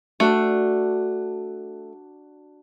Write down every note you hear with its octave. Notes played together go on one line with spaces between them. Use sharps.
A3 D4 F#4